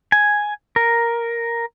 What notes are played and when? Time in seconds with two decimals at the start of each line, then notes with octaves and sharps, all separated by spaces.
0.12 G#5
0.76 A#4